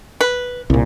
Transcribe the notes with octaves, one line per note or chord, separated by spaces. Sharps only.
B4
C2 A#2